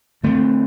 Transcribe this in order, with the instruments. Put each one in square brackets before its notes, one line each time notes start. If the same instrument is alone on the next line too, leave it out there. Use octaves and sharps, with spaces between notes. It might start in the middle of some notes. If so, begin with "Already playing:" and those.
[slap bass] D3 A3 C4